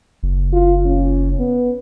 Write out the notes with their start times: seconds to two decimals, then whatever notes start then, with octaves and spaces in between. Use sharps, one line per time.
0.23 F#1
0.53 F4
0.86 C#4
1.39 B3